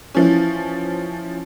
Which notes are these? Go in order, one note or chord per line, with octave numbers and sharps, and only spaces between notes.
E3 F3 C#4